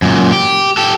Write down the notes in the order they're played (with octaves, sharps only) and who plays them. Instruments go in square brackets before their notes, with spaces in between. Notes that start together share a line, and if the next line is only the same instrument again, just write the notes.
[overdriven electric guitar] F#2 A#2
G4
G4 A4